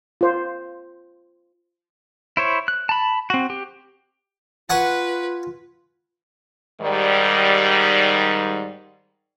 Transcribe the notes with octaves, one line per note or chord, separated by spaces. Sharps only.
F4 C5
E4 C5 C#5
F#6
A5 B5
C4 F#4
G4
F4 B4 F#5 G#5 C#6
G#2 D#3 G3